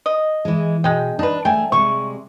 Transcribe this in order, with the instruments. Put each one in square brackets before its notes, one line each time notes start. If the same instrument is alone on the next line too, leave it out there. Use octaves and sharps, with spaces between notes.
[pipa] D#5
[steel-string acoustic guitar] E3 G#3
[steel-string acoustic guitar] B2 [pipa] G#3 G5
[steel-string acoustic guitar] D4 [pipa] D#4 B4
[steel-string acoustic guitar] A3 [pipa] G5 G#5
[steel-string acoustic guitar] C3 G3 G#3 [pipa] C#6